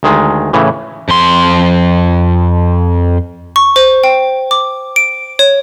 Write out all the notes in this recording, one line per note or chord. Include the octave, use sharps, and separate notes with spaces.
D2 D#3 G#3
A2 C#3 E3
F2 C6
C#6
C5
G5
D6
D7
C#5